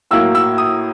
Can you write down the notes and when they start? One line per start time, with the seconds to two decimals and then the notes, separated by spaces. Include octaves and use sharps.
0.11 A2 F#3 A#3 E6
0.35 E6
0.58 D#6